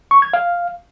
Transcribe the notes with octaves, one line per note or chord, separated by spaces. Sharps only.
C#6
G#6
F5